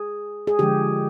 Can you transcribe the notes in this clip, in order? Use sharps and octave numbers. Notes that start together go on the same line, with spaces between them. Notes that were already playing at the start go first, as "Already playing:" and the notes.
Already playing: G#4
G#4
D3 F3 G#3 G4